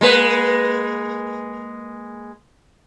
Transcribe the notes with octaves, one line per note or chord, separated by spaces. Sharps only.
G#3 A#3 B4